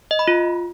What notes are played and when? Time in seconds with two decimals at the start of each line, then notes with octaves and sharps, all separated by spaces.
0.11 D#5
0.19 B5
0.28 F4